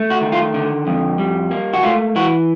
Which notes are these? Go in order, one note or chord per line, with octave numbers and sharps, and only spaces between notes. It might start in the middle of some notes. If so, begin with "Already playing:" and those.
Already playing: A3
F#4
D#3
F4
D3
F2
G3
A#3
F#4
A3 F4
E3 F#4